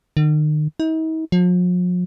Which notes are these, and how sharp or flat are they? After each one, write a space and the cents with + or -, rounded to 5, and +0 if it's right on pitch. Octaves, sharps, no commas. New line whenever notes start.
D#3 -40
D#4 +45
F3 +45